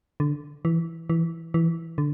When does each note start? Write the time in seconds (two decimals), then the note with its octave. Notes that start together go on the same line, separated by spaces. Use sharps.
0.20 D3
0.65 E3
1.10 E3
1.54 E3
1.98 D3